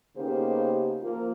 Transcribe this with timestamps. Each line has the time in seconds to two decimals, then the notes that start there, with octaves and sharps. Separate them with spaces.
0.17 C#3 A#3 B3 D#4 G4 C5
1.02 F3 A#3 F4